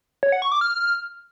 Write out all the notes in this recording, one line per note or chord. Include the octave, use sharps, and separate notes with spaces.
C#5
F#5
C#6
D6
F6